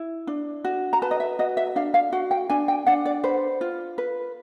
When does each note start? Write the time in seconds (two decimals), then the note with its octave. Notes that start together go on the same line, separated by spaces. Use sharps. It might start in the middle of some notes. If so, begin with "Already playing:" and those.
Already playing: E4
0.27 D4
0.65 F#4
0.93 A#5
1.02 B4 A5
1.11 D#5
1.20 E5
1.39 F#4 D#5
1.57 E5
1.76 D4 F5
1.94 F5
2.12 F#4 F#5
2.31 G5
2.50 D4 G#5
2.68 G5
2.87 D4 F#5
3.05 D5
3.23 B4 C5
3.61 F4
3.98 B4